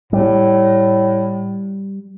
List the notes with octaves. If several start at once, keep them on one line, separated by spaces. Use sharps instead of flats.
A2 G3